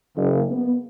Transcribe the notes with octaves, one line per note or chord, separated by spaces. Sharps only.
F#1
B3